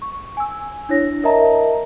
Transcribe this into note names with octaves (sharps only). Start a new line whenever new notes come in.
C#6
G#5 E6
D4 E4 C#5 A#6
A#4 D#5 E5 A5 A#5